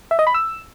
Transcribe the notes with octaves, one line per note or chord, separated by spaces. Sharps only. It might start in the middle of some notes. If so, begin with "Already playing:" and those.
E5
D#5
B5
E6